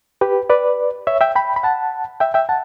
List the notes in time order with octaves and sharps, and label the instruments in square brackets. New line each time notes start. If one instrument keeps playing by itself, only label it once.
[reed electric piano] G4 B4
B4 D5
C#5 E5
E5 G5
G5 B5
B5
F#5 A5
E5 G5
E5 G5
F#5 A5